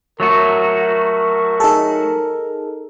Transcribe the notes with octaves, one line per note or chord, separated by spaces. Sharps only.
F#3 A3 F#4 A#4
D#4 G#4 A4